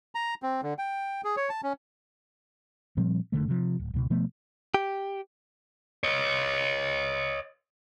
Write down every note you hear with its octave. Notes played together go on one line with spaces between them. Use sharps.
A#5
C4
D3
G5
G#4
C#5
A5
C#4
A#2 F3 G3 C4
F#1 B1 D3 A3
C3 F3
D1
C#2 B2
B2 F3 A3 B3
G4
C#5 D#5